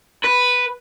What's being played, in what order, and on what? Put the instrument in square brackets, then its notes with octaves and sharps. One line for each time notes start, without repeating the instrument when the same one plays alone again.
[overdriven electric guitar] B4